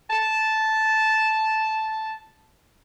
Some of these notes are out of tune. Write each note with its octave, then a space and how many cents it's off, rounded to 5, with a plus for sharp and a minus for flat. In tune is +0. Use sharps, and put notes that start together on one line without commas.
A5 -5